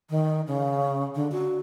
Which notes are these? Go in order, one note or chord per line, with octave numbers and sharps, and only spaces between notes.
D#3
C#3
D3
F#4